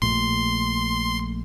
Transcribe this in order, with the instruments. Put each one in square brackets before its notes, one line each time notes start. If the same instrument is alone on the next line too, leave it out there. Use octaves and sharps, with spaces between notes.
[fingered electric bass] A#1 A#2 A3 [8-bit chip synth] C6